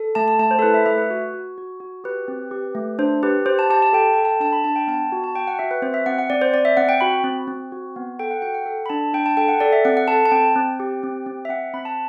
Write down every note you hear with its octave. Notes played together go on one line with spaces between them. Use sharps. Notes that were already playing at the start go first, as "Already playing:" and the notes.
Already playing: A4
A3 A5
A5
A3 A5
C5
A4
E4 B4
E5
A3 E5
B4
F#4
F#4
F#4
F#4
G4 B4
C4
G4
A3
D4 C5
G4 B4
G4 C5
A5
G4 A5
A5
A4 G5
A4 G5
A5
D4 A5
B5
D4 A5
G5
B3 A5
F#4
A5
F#4 G5
F#5
F#4 E5
B4
C4 C5
E5
C4 F#5
F#5
C4 D5
C5
C4 D5
E5
C4 F#5
G5
F#4 B5
C4
C4
F#4
B3
A4 G5
F#5
F#4 G5
F#5
A4
B5
D4 A5
D4 G5
A5
A4 G5
F#5
A4 D5
E5
C4 F#5
F#5
A4 A5
A5
C4 G5
C4
G4
C4
C4
E5
C4 F#5
C4 B5
A5